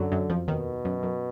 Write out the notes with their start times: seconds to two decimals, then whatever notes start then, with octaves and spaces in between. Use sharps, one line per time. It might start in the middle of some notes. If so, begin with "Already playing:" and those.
Already playing: F#2 D3 F#3
0.12 F#2 F#3
0.30 F2 F3
0.47 D#2 B2 D#3
0.85 F#2
1.03 F#2